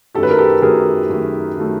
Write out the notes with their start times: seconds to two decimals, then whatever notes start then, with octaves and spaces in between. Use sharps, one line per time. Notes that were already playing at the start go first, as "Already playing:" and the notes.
0.15 F#2 D#3 F#3 A3 G4 A4
0.23 B4
0.31 A#4
0.38 G4 A4
0.62 F#2 D#3 F#3 A3 G#4 A#4
1.10 F#2 D#3 F#3 A3
1.58 D#3 F#3 A3